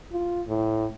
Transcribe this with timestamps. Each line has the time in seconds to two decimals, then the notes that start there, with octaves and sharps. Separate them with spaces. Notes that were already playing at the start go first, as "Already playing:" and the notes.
0.12 F4
0.48 A2